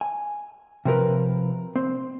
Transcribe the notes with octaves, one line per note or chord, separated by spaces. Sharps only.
G#5
C3 F3 A#4 B4
C4